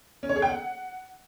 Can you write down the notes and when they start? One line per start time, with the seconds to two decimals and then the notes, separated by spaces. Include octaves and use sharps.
0.23 C#4
0.29 C#5
0.36 G#4
0.42 G5
0.49 F#5